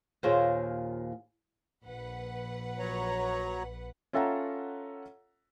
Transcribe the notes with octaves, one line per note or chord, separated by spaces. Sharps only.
D#2 A#2 F4 G#4 C5 C#5
A#1 B4 F#5
F#3 C#5 A#5
C#4 F4 A4 E5 F#5 A#5